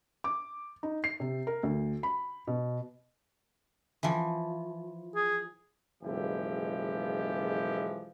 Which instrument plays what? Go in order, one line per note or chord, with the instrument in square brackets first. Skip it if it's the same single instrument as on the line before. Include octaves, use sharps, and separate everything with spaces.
[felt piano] D6
D#4
C7
C3
A#4
D2
B5
B2
[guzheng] E3 F3
[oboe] G#4
[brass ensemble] F#1 B1 E3 F3 G#3 G4